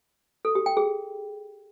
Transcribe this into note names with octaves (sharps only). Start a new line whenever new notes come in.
A4
G4
G5
G#4